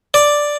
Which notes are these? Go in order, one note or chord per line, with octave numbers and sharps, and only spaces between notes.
D5